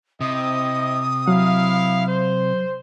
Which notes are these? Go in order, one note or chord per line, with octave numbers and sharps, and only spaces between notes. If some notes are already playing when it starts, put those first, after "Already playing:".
C3 C4 E4 D#5 D#6
F#3 E4 F5
C5